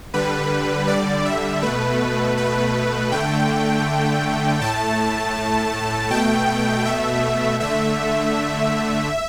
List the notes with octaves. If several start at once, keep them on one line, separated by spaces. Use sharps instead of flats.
D3 G3 B4
D5
E5
B2 A3 B4
B4
D3 A3 G5
A2 A3 A5
B2 A3 G5
E5
D3 A3 E5